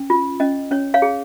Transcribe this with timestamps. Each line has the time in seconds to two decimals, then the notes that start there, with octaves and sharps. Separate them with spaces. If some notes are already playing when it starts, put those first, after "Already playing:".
Already playing: C#4
0.10 F4
0.40 C#4 D#5
0.71 C#4 C#5
0.94 C#5 F5
1.02 G#4